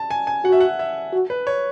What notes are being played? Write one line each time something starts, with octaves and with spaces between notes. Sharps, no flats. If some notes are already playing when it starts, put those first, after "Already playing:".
Already playing: A5
G#5
G#5
F#4 F#5
E5
F#5
E5
F#4
B4
C#5